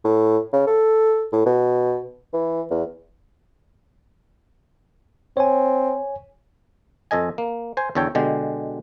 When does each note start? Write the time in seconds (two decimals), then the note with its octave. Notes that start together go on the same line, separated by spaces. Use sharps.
0.04 A2
0.53 C#3
0.67 A4
1.33 A2
1.46 B2
2.34 E3
2.71 E2
5.37 C4 C#5 G#5
7.11 F2 A4 D#5 G#5
7.38 A#3
7.77 C5 G#5
7.95 E2 D3 A4 C#5 G5
8.15 B2 D3 G#3 G4